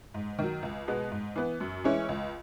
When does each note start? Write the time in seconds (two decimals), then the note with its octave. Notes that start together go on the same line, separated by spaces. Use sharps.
0.14 G#2
0.39 D#3 F#3
0.63 C#2
0.88 B2 G#3 B3
1.11 G#2
1.36 E3 B3
1.60 F#2
1.84 E3 G#3 C#4 E4
2.09 C#2